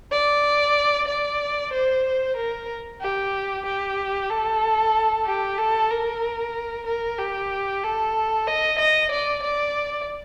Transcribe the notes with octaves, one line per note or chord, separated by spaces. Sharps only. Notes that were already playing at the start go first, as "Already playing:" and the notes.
D5
D5
C5
A#4
G4
G4
A4
G4
A4
A#4
A#4
G4
A4
D#5
D#5
D5
D5